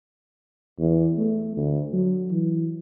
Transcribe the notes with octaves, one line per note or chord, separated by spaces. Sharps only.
E2
A3
D2
F#3
E3